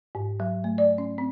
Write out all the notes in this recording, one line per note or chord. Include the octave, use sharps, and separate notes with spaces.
G#2
F#3
A3
D5
C#4
C4